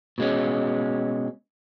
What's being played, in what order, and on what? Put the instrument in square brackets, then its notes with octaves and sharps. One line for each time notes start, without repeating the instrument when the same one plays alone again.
[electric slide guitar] B2 G#3 C#4